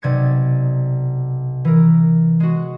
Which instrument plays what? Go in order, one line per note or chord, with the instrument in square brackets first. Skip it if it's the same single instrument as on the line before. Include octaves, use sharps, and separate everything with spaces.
[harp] B1 C3 D5 G#6 A6 C#7
E3 A#4
G#3 F#4